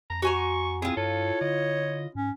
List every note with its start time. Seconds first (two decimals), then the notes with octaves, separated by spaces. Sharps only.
0.10 F2 A#5
0.22 F#4 G#5 A#5 C#6
0.82 C4 E4 F4 G#4
0.97 G2 A4 C#5
1.41 D3 D#5
2.15 G#2 C#4